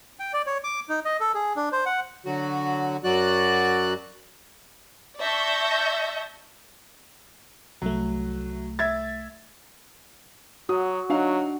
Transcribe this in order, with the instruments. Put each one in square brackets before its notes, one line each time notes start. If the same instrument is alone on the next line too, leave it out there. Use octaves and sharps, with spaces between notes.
[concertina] G5
D5
C#5
D6
D#4
D#5
A4
G#4
D4
C5
F#5
[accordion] D3 F#3 F#4
F#2 F#3 F#4 D5 F#6
[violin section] D5 E5 A5 C#6 G6 A#6
[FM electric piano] C2 A3 [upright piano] F#3
[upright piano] E5 G#6 A6
[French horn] F#3 [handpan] F#4 [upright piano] D#6
[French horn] F#3 [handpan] D4 [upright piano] D#4 F#4 F5